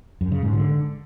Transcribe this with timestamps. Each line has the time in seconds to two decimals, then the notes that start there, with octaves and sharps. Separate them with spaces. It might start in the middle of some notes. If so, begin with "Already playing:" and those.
0.21 F#2
0.32 C#3
0.42 G#2
0.53 D3